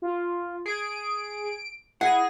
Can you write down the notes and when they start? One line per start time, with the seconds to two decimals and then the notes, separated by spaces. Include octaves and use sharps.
0.02 F4
0.66 G#4 D7
2.01 E4 G#4 F#5 A#6